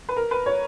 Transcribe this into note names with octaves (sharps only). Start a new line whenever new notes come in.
B4
A#4
B4
C#5